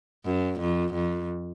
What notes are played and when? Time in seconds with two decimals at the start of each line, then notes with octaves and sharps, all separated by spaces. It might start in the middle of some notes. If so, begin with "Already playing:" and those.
0.25 F#2
0.60 F2
0.94 F2